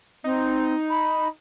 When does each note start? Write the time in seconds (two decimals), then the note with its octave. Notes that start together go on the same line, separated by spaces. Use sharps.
0.24 C4 D#4
0.90 B5